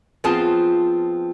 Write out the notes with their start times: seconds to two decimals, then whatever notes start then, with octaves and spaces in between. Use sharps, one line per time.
0.24 F3 B3 C4 F4 G#4 A5